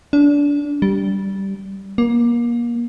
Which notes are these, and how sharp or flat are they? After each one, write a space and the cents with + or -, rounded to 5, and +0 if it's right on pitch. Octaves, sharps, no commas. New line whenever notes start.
D4 -25
G3 -10
A#3 +30